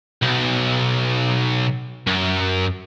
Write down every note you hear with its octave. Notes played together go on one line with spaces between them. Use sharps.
B1
F#2